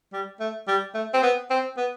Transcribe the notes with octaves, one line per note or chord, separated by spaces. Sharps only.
G3
A3
G3
A3
C4
B3
C4
B3